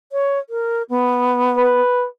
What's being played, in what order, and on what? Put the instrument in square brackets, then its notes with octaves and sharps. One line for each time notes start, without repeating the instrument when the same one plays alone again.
[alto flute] C#5
A#4
B3
[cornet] B4